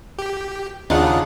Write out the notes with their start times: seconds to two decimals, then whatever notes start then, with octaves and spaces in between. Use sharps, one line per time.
0.18 G4
0.90 D#2 C#3 D4 D#4 F4 F#5